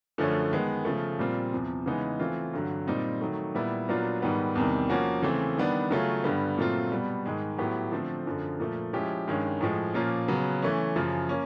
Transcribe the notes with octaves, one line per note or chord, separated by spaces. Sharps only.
F#2 D3 F3 A3 C#4
D#3 G#3 B3
C#3 F3 A3
A#2 G3 C4 F4
E2 C3 F3
C#3 E3 G#3 B3 D#4
E3 A3 C4 F4
G2 D3 F#3
A#2 G3 C4 D#4
D#3 F#3 A3
A#2 G3 B3 E4
A#2 F#3 B3 D4 F4
G#2 D#3 G3 B3
E2 C3 D#3 G3
F3 A#3 C#4 F#4
C#3 E3 A3 C4
D#3 G3 B3 D4
C#3 F#3 A3 C#4 F4
G2 D3 G3 B3
A#2 F#3 A3 C4 F4
B2 G3 B3
G#2 D#3 G#3
A2 F#3 B3 E4 G4
D3 F3 A3 C4
F#2 D3 F3
A#2 F3 A3
F3 G#3 C#4 E4 G4
G2 D#3 G#3 C#4
A2 F3 G#3
A#2 F3 A#3 C#4 F4
C#3 F#3 B3
E3 A3 C#4
F#2 C#3 F3
A#3 C#4